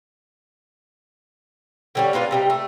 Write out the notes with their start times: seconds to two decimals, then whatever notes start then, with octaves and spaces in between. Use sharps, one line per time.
1.95 D3 G3 C#4
2.13 A#3 D4 F4 B4
2.31 C3 G3 D#4
2.50 A3